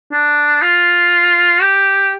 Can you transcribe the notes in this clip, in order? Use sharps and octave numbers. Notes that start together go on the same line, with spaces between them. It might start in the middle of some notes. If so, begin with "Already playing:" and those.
D4
F4
G4